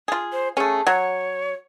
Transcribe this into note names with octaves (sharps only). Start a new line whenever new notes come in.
F4 G#4
C5
A3 C#4 G#4
F#3 C#5